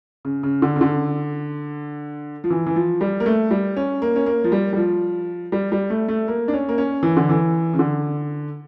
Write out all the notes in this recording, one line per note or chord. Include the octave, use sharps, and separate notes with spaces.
C#3
C#3
D3
C#3
D3
F3
E3
E3
F3
G3
A#3
A3
G3
C#4
A#3
C#4
A#3
F3
G3
G3
F3
G3
G3
A3
A3
A#3
D4
C#4
A#3
C#4
E3
D3
E3
C#3
D3